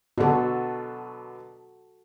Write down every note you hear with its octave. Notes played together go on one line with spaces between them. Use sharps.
B2 D3 F#3 F#4 A4